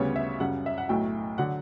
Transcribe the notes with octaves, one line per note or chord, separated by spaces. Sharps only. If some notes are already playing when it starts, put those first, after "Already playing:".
Already playing: D2 C#3 G3 B3 C#5
E5
F#2 C#3 G3 F#5
E5
F#5
B1 A2 F#3 A3 G5
D3 F#3 F#5